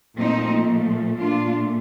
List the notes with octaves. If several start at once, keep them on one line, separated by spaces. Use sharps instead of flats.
A#2 F3 A3 C4 D#4
A#2 A3 D4 F4